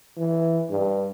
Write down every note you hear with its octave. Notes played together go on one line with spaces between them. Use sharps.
E3
G2